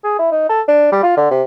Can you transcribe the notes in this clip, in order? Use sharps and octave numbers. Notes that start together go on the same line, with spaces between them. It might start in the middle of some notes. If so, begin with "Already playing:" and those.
G#4
E4
D#4
A4
D4
G3
F4
D3
C3